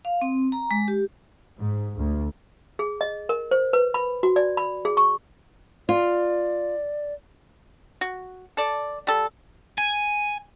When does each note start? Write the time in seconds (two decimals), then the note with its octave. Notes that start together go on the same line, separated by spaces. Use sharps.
0.05 F5
0.21 C4
0.52 A#5
0.71 G#3
0.88 G4
1.59 G#2
1.97 D2
2.79 G#4
3.01 D#5
3.29 A#4
3.51 C5
3.73 B4
3.94 B5
4.23 F#4
4.36 D5
4.57 B5
4.85 G#4
4.97 C#6
5.89 F4 D5
8.01 F#4
8.57 A4 D5
9.07 G3 A4
9.78 G#5